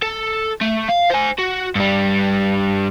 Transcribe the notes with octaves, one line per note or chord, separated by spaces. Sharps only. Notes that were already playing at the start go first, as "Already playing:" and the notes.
A4
A3
F5
C5 G#5
F#4
G2 G3